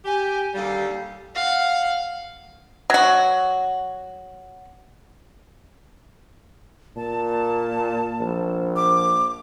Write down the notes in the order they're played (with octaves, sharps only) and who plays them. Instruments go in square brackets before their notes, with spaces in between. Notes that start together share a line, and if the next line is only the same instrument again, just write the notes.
[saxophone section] G4 [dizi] G#5
[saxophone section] D#2 D3 G3 [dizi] F5
[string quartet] F5 F#5
[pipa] F#3 F#4
[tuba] A#2 [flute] A5
[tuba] A#1
[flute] D6